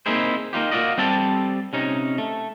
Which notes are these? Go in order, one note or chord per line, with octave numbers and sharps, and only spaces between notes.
A#3 C4 D#4 E4 G#4 C5
A#3 D#4 F4 G4
A#3 F4 F#4 D5 D#5
G3 C4 G4 A4 A5
C3 C#4 D#4
A3